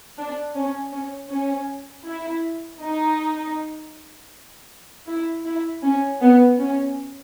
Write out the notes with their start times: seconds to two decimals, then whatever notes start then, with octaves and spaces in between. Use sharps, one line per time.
0.18 D4
0.55 C#4
0.92 C#4
1.30 C#4
2.06 E4
2.81 D#4
5.07 E4
5.45 E4
5.83 C#4
6.20 B3
6.59 C#4